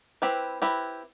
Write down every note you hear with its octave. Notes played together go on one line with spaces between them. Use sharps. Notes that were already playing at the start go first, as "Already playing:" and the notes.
C4 E4 G4 B4
C4 E4 G4 B4